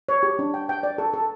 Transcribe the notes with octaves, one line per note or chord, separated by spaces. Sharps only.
C#5
G4
D4
G5
G5
D5
A4
A4